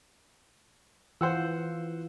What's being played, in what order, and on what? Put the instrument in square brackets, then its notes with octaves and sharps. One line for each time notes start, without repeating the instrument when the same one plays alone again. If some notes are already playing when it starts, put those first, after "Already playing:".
[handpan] E3 F4 [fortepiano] C5 F#5 E6